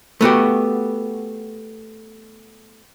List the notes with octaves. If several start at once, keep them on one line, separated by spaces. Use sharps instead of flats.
A3 B3 F#4 G4